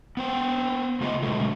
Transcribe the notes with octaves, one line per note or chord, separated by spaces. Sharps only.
B3 C5 G5
C#3 A3 F4 G#4 D#5
B2 D3 D#3 F#3 G#3 A3